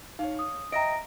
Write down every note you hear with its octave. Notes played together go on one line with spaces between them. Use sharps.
D#4 C#5 F5
D#6
D#5 E5 G5 A#5 A#6 D7